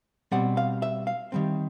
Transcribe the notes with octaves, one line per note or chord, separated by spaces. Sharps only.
B2 G3 C4 F#5
F5
E5
F5
D#3 G3 C4